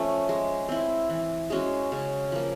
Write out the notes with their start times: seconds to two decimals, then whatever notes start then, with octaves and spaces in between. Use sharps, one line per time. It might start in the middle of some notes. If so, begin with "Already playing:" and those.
Already playing: F3 A3 C#4
0.29 G#3
0.68 C4 E4
1.10 E3
1.50 G#3 C#4 F#4
1.92 C#3
2.32 F3 A#3